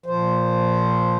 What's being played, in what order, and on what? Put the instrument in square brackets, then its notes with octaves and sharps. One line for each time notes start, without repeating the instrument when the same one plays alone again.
[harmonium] A#2 F3 C5